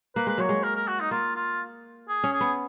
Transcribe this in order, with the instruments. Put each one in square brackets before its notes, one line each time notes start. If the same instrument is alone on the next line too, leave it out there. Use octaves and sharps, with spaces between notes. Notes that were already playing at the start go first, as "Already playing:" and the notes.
[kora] A#3 [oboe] B4
[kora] G#3 [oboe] B4
[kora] F#3 [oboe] C#5
[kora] G#3
[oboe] A#4
A#4
F#4
D#4
[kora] A#3 [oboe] F4
[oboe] F4
G#4
[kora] C#4
[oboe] G#4
[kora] B3